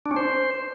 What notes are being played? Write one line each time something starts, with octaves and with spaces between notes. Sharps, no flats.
D4
C#4
C5